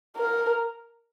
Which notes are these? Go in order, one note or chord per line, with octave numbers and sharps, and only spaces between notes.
A#4